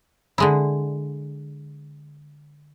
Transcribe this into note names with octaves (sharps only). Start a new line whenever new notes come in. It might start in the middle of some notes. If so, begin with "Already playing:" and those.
D3 G#3 E4